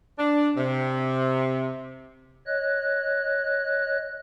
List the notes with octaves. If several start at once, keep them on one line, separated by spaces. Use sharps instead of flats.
D4
C3
C#5 D#5 F#6